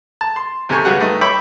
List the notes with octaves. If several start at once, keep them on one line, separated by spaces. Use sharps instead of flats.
A5
C6
D#2 C3 G4 A4 G#5 C#6
G2 C#3 G#3 F#4 G4 F#5
G2 A3 D#4 D#5
C#5 E5 G5 B5 D6